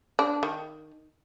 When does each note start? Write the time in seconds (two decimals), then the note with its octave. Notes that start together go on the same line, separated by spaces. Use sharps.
0.19 D4
0.43 D#3